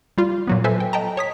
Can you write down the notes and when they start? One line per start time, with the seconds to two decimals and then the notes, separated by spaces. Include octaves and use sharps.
0.18 G3 F4
0.47 A#2 F#3 B3
0.64 A4 B4 C5 E5 G#5
0.80 G5
0.93 D#5 G5 A5 A#5
1.17 C#5 D#6 B6